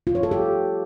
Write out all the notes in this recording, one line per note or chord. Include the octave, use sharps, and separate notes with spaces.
F4
C#5
A4
G4